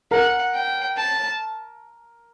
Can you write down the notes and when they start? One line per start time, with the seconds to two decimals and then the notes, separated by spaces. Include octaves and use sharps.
0.11 A#4 F#5
0.54 G5
0.97 A5